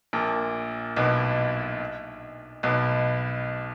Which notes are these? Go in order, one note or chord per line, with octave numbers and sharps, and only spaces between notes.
A#1 A#2
B1 B2
B1 B2